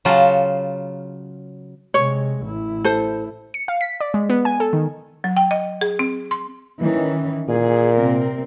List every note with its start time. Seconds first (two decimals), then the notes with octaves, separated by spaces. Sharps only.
0.05 C#3 F#3 F4 A5 A#5
1.94 C3 G#3 C#5
2.44 A1 E4
2.85 A4 C5
3.54 C#7
3.68 F5
3.81 B6
4.01 D5
4.14 G#3
4.30 B3
4.45 G#5
4.60 A4
4.73 D#3
5.24 F#3
5.37 G5
5.51 D#5
5.81 G#4
5.99 C4
6.31 C6
6.80 D#3 E3 C#4
7.49 A#2 G#4
7.96 C3 C4 A#4